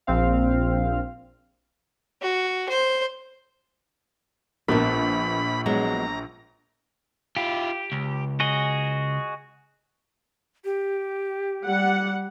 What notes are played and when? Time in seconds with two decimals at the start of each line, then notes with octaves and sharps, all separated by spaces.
0.07 A#1 C4 F5
2.22 F#4
2.69 C5
4.68 A#1 B3 A#4 A5 B5
5.66 F#3 G#3 B3 A#5
7.37 E4 F4 G4
7.92 C#2
8.40 F#4 G#4 D#5
10.65 G4
11.66 G3 F#5